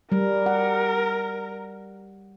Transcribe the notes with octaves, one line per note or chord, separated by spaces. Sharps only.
G3 A#4
F#5